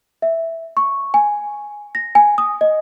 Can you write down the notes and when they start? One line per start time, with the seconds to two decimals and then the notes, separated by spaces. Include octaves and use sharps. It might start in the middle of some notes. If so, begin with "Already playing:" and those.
0.22 E5
0.77 C#6
1.14 G#5
1.95 A#6
2.15 G#5
2.38 D#6
2.61 D#5